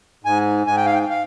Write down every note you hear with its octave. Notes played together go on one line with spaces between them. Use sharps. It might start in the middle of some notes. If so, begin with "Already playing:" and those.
G#2 G#5
G#2 G#5
G5
F5
G5
F5